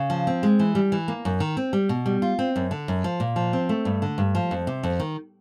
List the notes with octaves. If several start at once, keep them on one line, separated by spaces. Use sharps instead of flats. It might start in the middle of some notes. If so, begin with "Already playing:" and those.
Already playing: C#3
F3
C4
G#3
E3
G3
E3
A#3
F#2
D#3
C4
G3
B2
G3
F4
C4
F#2
D3
F#2
F3
A#2
F3
C4
A3
G2
D3
G2
F3
F2
C3
F2
D#3